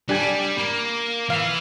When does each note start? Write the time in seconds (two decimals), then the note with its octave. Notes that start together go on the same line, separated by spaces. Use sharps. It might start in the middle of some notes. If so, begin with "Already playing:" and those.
0.09 G3 D4 G4 G#5
0.58 A#3
1.30 E3 F5